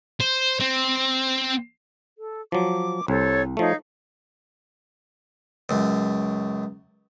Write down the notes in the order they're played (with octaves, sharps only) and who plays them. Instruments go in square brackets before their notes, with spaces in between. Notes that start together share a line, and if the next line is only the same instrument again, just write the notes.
[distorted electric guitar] C5
C4
[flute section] A4
[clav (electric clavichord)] F3 F#3 [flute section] D6
[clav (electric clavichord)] C2 [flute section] A4 C5 C#5
[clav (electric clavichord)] F3 A3 [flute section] D#4 C#5 F5
[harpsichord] C#2 F#2